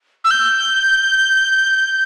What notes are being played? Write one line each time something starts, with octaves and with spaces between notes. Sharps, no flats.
E6
G6